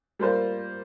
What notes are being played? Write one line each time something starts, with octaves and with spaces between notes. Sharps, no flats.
G3 A#3 F4 C5